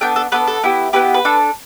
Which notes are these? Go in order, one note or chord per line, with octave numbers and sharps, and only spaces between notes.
B3 D4 A4 G5
A4
B3 D4 A4 B4
A4
B3 E4 G4
B3 E4 G4 B4
B4
D4 A4